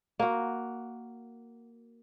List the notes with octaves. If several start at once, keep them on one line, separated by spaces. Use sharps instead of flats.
A#3 F#4